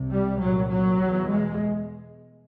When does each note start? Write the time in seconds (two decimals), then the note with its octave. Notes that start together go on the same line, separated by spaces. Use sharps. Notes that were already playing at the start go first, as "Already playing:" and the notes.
Already playing: C2 C3
0.11 G3
0.41 C2 A#2 F#3
0.70 F#3
1.01 E2 B2
1.30 G#3